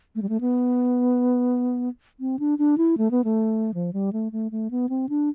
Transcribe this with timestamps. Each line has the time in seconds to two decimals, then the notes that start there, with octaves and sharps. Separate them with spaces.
0.15 A3
0.22 G3
0.29 A3
0.41 B3
2.20 C4
2.39 D4
2.59 D4
2.78 E4
2.98 A3
3.11 B3
3.24 A3
3.74 F3
3.93 G3
4.13 A3
4.32 A3
4.52 A3
4.71 B3
4.89 C4
5.09 D4